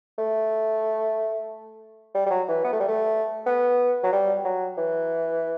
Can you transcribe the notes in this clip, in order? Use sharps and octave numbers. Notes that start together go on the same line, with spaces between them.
A3
G3
G3
F#3
E3
B3
A3
G3
A3
B3
F#3
G3
F#3
E3